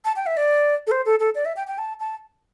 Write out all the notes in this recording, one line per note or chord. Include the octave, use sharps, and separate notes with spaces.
A5
G5
E5
D5
A4
C5
A4
A4
D5
E5
G5
G5
A5
A5